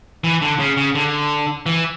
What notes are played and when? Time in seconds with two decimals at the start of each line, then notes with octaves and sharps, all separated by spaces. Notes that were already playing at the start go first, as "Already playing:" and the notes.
0.24 E3
0.42 D3
0.59 C#3
0.77 C#3
0.95 D3
1.66 E3